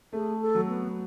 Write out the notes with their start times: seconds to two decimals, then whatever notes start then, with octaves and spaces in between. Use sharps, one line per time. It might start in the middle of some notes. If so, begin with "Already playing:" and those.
0.13 A3 G#4
0.41 A4
0.55 F#3
0.68 B3